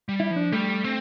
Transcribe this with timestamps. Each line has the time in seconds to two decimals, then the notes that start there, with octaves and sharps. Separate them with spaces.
0.09 G3
0.20 E4
0.31 F3
0.36 D4
0.52 G3 A3
0.84 C4